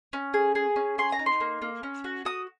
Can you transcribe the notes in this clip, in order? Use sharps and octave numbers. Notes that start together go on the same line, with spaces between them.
C#4
G#4
G#4
C#4
G#4 C6
A#5
D#4
C6
A#3
A#3
C#4
F#4
F#4 D#6